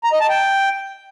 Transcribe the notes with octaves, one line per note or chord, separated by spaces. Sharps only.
A#5
D#5
A5
G5